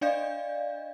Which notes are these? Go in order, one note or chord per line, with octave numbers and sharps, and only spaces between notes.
D4 D5 D#5 F5 G6